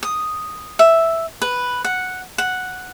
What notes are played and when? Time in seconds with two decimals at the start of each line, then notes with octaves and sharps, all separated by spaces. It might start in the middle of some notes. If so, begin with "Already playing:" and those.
0.03 D#6
0.79 E5
1.42 B4
1.84 F#5
2.38 F#5